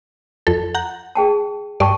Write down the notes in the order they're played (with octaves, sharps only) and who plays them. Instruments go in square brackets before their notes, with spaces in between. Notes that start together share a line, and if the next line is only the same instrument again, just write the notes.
[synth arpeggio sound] F2 A4
F#5 A#5 G6
[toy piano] G#4 G5 A5
[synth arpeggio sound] G2 D5 [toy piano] G5 A5 C#6